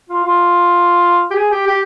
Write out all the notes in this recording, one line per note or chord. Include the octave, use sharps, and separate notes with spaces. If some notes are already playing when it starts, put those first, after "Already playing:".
F4
F4
G4
G#4
G4
G4